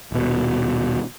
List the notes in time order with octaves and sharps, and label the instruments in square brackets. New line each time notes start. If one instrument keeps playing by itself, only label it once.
[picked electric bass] D#1 B2